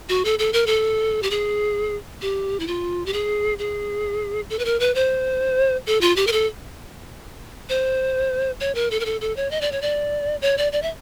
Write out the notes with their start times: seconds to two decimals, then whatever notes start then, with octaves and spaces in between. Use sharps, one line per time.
0.09 F#4
0.25 A4
0.39 A4
0.53 A#4
0.67 A4
1.23 G4
1.30 G#4
2.22 G4
2.60 E4
2.67 F4
3.06 G4
3.13 G#4
3.59 G#4
4.50 A4
4.59 B4
4.65 A#4
4.80 B4
4.95 C5
5.87 A4
6.01 F4
6.16 G4
6.27 A#4
6.32 A4
7.69 C5
8.60 C#5
8.75 A#4
8.91 A4
9.00 A#4
9.05 A4
9.21 A4
9.36 C#5
9.51 D#5
9.61 D5
9.72 C#5
9.82 D5
10.42 C#5
10.58 D5
10.72 D5
10.82 E5